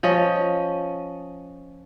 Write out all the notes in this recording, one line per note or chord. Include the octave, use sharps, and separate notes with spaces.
F3 C#4 D#5